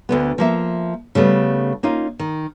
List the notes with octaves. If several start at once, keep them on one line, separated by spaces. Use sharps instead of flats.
D2 D3 B3
F3 A#3 E5
C#3 G3 A3 B3
A#3 C#4 D#4 F4
D#3